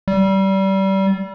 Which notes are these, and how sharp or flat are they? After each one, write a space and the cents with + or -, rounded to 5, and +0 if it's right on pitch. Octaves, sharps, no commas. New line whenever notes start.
G3 -25